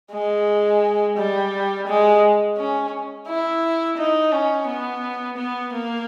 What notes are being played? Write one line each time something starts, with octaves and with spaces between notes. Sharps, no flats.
G#3
G3
G#3
C#4
E4
D#4
C#4
B3
B3
A#3